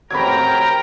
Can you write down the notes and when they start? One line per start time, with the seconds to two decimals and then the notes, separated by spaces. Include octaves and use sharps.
0.11 A1 F2 F#3 A#4 G5 A#5 B5 G#6